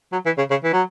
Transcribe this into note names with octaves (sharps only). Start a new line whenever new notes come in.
F#3
E3
C#3
C#3
E3
F#3